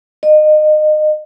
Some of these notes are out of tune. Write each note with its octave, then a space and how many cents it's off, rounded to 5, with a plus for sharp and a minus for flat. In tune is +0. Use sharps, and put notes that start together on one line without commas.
D#5 -25